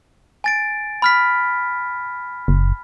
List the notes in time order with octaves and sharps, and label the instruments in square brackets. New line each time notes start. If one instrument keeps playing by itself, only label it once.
[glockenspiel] G#5 A6 D7
B5 F6 B6
[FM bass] F#1